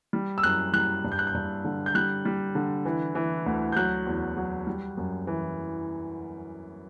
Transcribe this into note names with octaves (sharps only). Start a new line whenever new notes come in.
G3
E6
F#2 F#6
G3 F#6
G2
G6
F#6
G6
G2
D3
G6
G3 F#6
G3
D3
E3
E3
D2
G6
F#3 F#6
E2
F#3
G3
F#2
E3